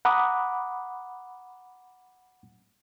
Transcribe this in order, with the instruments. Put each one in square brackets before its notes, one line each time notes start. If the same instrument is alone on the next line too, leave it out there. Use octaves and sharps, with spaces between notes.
[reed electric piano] F#5 A#5 B5 D6 D#6